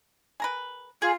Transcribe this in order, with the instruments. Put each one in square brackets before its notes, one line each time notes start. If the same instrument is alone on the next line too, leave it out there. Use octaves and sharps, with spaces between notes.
[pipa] G#4 A#4 B4
[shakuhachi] F4 [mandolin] G#4